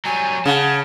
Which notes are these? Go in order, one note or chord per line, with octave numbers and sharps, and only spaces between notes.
F#3 G3 G#5
C#3 F#5 A5